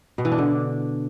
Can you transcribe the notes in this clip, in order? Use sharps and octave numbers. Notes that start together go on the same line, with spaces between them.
B2
E3
D4
D3